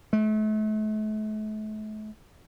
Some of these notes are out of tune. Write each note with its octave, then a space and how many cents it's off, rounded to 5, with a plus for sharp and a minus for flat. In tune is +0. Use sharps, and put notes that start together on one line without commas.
A3 -40